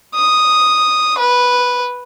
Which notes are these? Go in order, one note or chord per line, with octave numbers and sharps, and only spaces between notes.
D#6
B4